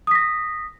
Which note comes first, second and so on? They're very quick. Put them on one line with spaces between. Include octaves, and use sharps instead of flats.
D#6 B6 A#6